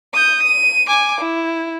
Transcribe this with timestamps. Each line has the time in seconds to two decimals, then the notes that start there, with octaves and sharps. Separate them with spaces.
0.14 D#6 G6
0.43 D#7
0.88 G#5 D6
1.21 E4